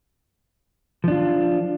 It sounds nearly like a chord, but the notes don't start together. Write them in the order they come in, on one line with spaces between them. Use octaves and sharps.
F3 D4 F4